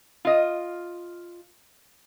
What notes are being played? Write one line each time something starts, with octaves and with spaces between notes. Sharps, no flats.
F4 D#5